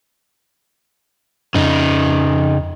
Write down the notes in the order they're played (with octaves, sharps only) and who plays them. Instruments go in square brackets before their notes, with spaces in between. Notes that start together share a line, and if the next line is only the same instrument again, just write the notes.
[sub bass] F2 [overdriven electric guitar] C#3 D#4